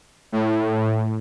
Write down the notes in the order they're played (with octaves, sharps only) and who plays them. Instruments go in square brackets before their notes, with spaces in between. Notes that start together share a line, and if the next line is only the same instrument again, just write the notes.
[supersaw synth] A2